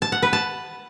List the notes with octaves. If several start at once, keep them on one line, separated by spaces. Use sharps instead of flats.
A5
F#5
B4
A5